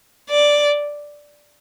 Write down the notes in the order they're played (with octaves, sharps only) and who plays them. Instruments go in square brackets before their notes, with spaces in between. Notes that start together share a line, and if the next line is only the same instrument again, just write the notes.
[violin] D5